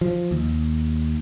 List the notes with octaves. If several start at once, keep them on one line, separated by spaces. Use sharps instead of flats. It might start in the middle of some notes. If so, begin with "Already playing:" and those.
F3
D#2